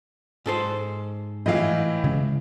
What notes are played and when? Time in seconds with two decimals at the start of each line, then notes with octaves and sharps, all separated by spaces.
0.46 G#2 A4 C5
1.46 A2 E3 E4 D#5 F5
2.04 C#3 G#3 C#4